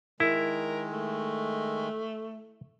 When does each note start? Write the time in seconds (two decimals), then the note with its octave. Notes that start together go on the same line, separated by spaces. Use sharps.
0.20 D#3 G#3 E4 A#4
0.93 A3